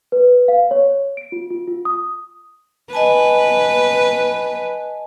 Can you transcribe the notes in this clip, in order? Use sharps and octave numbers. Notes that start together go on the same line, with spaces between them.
B4
F5
C#5
D7
F4
F4
F4
D#6
B4 D#5 G#5 A5